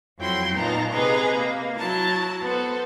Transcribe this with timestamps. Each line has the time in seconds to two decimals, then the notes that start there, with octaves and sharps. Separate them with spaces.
0.19 F2 F#3 E4 G5 C6
0.55 A#2 B3 D#4 A5 A#5
0.92 C3 G#4 B4 D#5 A#5 G#6
1.36 A#3
1.77 F#3 E4 A5 A#5
2.43 B3 A4 C5